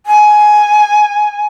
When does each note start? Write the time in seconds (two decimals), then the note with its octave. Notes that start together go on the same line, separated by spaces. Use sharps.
0.06 G#5